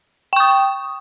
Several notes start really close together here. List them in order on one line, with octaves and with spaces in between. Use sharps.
G5 C#6 D#6